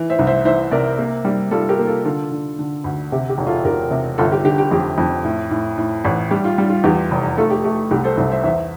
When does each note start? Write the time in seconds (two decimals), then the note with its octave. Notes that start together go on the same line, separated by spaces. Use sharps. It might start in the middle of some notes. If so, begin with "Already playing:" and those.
Already playing: E3
0.10 C5 E5
0.19 C2
0.27 C5 E5
0.45 E3 C5 E5
0.71 C3 A#4 D5
0.98 A#3
1.25 G3
1.51 G3 F4 A4
1.69 G4 A#4
1.79 A#3
1.87 F4 A4
2.05 D3 F4 A4
2.31 D3
2.59 D3
2.84 D2
3.12 C3 G4
3.29 G4
3.38 E1
3.47 F4 A4
3.64 E1 G4 A#4
3.91 C3
4.18 G1 F4 A4
4.32 G4
4.44 D3 G4
4.58 G4
4.71 F2 G4
4.98 F2
5.24 A2
5.51 A2
5.78 A2
6.05 A1
6.31 G3 G4
6.44 F4
6.58 G3
6.70 F4
6.84 E2 G4
7.11 F1
7.37 A3 F4 A4
7.50 G4
7.64 A3 G4
7.91 C2 G4
8.04 A4 C5
8.17 C2 C5 E5
8.31 C5 E5
8.44 E2 C5 E5